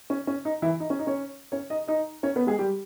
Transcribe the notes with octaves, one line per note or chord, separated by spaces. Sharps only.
C#4
C#4
D#4
E3 E4
D#4
C#4
D#4
C#4 C#5
C#4 C#5
D#4 D#5
D#4 D#5
C#4 C#5
B3 B4
G#3 G#4
G3 G4